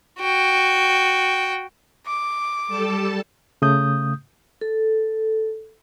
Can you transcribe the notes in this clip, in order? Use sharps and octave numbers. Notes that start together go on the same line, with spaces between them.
F#4 G5
D6
G3 A4 A5
C#3 A3 D#6 G6
A4